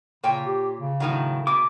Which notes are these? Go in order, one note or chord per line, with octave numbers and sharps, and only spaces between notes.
A#2 C#3 C#5 G5
G4
C#3
A2 D#3 F#3
B2 D6